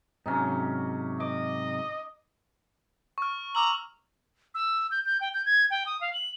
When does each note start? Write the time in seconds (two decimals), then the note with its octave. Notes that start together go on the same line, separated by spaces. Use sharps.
0.26 G#2 C3 F#3 C#4 D#4
1.20 D#5 D6
3.18 C#6 F6
3.55 A#5 D6 E6 F#7
4.55 E6
4.91 G6
5.06 G6
5.21 G5
5.34 G6
5.46 G#6
5.71 G5
5.86 D#6
6.01 F5
6.13 F#7